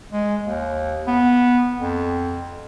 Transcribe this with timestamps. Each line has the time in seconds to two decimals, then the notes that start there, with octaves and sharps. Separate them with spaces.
0.12 G#3
0.43 D#2
1.07 B3
1.77 F2